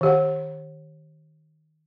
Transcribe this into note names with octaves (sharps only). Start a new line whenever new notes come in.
D#3 G4 F#5